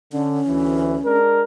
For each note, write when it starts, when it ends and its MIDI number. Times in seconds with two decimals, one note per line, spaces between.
0.13 0.40 50
0.13 1.19 61
0.48 0.96 38
0.48 0.96 52
1.04 1.43 56
1.04 1.43 62
1.04 1.43 70